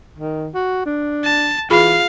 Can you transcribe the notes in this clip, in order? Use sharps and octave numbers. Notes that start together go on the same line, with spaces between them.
D#3
F#4
D4
A5
E3 F4 G#4 F5 B5